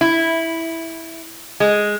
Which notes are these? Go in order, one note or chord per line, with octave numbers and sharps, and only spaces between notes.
E4
G#3